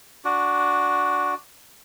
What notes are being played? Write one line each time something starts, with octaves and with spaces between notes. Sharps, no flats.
D4 F#4